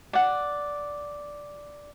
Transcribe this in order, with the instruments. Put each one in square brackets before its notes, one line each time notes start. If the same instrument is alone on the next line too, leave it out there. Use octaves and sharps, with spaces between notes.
[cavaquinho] D5 F#5